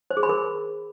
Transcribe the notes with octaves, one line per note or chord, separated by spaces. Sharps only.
C5
G#4
B5
A#4